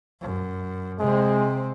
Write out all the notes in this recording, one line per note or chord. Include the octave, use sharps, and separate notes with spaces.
F#2
C3 G#3 C4